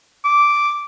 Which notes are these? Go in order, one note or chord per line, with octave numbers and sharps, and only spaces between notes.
D6